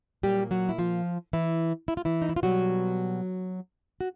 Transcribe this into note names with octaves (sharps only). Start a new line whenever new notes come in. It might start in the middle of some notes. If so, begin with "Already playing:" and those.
A#2 F#3 G3 A#3 G4
F#3 F#4
E4
F3 F4
E3 E4
E4
F4
E3 E4
D#4
E4
F4
B2 F#3 G3 B3 F#4
F#4